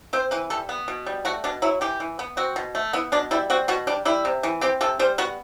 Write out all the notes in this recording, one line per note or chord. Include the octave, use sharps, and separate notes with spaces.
C4 C5
E3 B4
G3 A4
B3
B2
G3
A3 F#4
B2 D4
F#3 E4
E3 G4
E3
B3
C4 F#4
B2
A3
B3 E4
B2 D4
G3 E4
C4 F#4
B2 F#4
G3 D4
G3 E4
C3
E3
C4 G4
C3 A4
G3 C5
B3 F#4